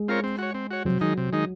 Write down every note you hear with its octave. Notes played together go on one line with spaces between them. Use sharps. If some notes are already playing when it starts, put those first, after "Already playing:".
Already playing: G#3
C4 F4 A#4 C#5
C4
F#4 C#5
C4
F#4 C#5
C3 F#3
D#3 G#3 D#4
C3
D#3 G#3 D#4